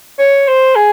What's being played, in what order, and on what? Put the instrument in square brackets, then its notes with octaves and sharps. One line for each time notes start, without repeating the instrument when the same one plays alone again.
[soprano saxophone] C#5
C5
G#4